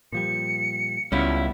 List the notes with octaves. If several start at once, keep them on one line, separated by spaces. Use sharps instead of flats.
A#2 F3 G3 C#7
C#2 G3 B3 C#4 E4 F4 B5